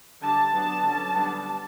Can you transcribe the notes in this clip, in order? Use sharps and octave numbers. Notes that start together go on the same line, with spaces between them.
D3 G3 D4 A5
F#3 B3 D4
D3 F#3 C#4
D3 G3 B3 D4